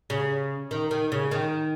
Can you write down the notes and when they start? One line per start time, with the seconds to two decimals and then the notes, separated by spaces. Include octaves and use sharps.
0.10 C#3
0.71 D#3
0.91 D#3
1.12 C#3
1.31 D#3